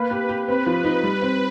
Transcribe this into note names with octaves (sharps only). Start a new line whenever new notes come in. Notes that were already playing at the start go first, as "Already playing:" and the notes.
Already playing: A#3 B4
G4
G4
C4 B4
F3
D#4
G3
C4